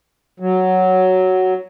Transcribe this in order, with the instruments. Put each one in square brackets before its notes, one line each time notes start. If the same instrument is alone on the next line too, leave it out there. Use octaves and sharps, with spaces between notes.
[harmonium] F#3